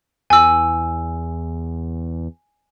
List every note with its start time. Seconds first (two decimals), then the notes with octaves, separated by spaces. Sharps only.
0.30 E2 G#5 E6